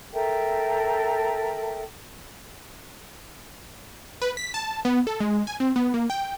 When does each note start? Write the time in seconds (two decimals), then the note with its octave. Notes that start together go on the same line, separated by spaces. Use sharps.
0.12 A4 A#4 E5 G5
4.22 B4
4.37 B6
4.54 A5
4.85 B3
5.07 A4
5.20 G#3
5.47 G#5
5.60 C4
5.76 B3
5.94 A#3
6.10 G5